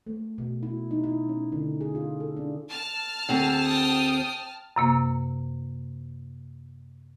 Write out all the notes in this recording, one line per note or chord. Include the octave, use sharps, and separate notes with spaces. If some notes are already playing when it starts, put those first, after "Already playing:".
A3
B2
E4
D#4
E4
C#4
D3
G#4
F4
A4
D4
A5 F6
D2 C4 G#4
G5 D#6
F#2 C3 A#3